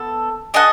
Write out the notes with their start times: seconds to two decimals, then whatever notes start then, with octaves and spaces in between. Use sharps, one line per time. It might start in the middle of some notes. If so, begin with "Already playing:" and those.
Already playing: B3 A4
0.54 G#4 D#5 F#5 A5